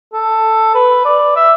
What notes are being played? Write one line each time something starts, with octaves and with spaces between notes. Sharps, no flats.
A4
B4
D5
E5